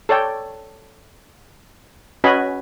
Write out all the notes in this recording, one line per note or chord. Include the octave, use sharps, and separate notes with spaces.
A4 C#5 D5 G5
C#4 F#4 B4 D#5 G#5 B5